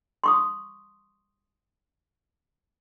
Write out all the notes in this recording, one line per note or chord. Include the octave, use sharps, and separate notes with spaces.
C6 C#6 D#6